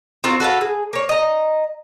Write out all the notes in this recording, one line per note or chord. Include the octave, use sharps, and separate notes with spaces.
C4 F4 F#4 A#4
F#4 A4 B4 F5
G#4
A#3 C#5
D#5 A#5